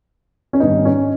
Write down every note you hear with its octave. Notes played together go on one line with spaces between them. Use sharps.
C#4
G#1 G2 G3 B3 D#4
C#4